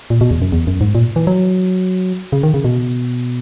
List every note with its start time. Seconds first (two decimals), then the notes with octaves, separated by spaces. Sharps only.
0.10 A#2
0.21 B2
0.31 E2
0.42 F#2
0.52 E2
0.67 F#2
0.81 G#2
0.95 A#2
1.16 E3
1.27 F#3
2.32 C#3
2.43 D#3
2.54 C#3
2.64 B2